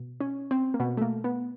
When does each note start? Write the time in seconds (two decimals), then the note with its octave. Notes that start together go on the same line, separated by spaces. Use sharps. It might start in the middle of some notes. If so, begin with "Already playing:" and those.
Already playing: B2
0.20 C#4
0.51 C4
0.74 A#3
0.80 B2 B3
0.97 A3
1.01 A#3
1.24 B3